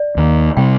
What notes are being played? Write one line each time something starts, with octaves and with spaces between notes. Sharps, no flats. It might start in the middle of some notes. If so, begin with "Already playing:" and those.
Already playing: D5
D#2 D#3 A#3
C3 G3 C4 G5